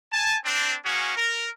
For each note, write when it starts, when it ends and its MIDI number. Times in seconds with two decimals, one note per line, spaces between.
0.13 0.37 80
0.13 0.37 81
0.45 0.74 60
0.45 0.74 62
0.85 1.15 58
0.85 1.15 61
0.85 1.15 66
0.85 1.15 68
1.16 1.49 70